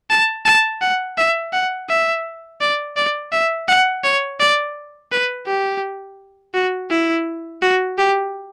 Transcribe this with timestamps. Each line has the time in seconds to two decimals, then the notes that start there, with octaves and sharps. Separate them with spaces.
0.10 A5
0.45 A5
0.81 F#5
1.18 E5
1.53 F#5
1.89 E5
2.61 D5
2.96 D5
3.32 E5
3.68 F#5
4.04 C#5
4.40 D5
5.12 B4
5.47 G4
6.54 F#4
6.90 E4
7.62 F#4
7.98 G4